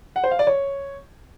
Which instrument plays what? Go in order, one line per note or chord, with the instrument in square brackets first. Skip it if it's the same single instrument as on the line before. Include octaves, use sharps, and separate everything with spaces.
[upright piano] F#5
C5
F5
D5
C#5